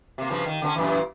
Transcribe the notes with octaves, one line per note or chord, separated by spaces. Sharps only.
C3 A#3
G2 C#3 F3
D#3
D3 B3 C#4
F#2 A#2 E3